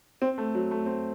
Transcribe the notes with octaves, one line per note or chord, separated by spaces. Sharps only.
C4
A3
F#3
A3
C4